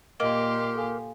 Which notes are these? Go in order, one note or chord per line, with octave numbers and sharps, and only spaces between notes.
A#2 A#3 G4 D#5 C6
A4 F5 G#5